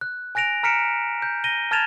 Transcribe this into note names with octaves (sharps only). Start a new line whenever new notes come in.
F#6
G#5 F#6 A#6 D7 F7
A#5 F6 B6 C#7 D7 E7
G6
A#6 D#7 G7
A5 F6 G#6 A6 E7 F7